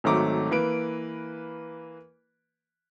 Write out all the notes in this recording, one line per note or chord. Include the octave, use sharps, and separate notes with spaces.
G#1 D#3 F#3 A3 A#5 D6
E3 A#3 B4 D7